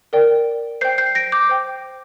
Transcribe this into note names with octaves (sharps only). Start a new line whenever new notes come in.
A#4 D5 G5
C5 G5 G6 C7
G6 C7
A#6 D7
D6 G6
C5 G5